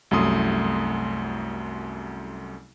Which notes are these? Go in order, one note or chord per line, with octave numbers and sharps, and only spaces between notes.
C2 F#2 A3 C6 D#6